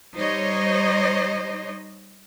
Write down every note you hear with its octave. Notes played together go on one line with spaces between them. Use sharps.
G3 D#4 C5 C#5 D#5